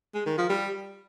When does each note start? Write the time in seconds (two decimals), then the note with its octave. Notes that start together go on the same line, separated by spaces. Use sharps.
0.15 G#3
0.26 D#3
0.38 F3
0.49 G3